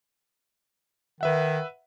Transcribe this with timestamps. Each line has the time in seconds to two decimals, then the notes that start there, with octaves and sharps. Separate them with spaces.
1.21 D#3 B4 E5 F#5